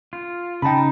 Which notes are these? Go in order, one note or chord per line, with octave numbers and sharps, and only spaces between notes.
F4
C#3 D#4 G5 A5 B5